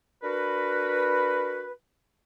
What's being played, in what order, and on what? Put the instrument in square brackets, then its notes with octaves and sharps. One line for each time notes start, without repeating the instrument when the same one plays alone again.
[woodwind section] D4 F#4 A#4 B4